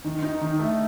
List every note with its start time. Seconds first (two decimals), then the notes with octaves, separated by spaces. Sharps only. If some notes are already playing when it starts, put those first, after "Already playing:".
0.04 D#3
0.23 D#4
0.41 D#3
0.59 A3